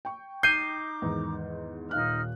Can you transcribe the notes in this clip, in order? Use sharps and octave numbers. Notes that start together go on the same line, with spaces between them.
G5 C#6
D#4 A#5 D6 G6 C7 D#7
E2 G#2 D#3
D#1 D#4 F5 F6 F#6